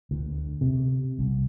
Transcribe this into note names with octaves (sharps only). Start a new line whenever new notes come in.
D2
C3
C2